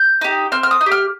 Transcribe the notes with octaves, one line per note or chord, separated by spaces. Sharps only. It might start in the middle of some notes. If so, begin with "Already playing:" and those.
Already playing: G6
D#4 G4
C4 F6
F6
D#6
D#4
G4
F6